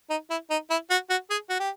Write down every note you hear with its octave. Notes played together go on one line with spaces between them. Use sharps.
D#4
E4
D#4
E4
F#4
F#4
G#4
F#4
G4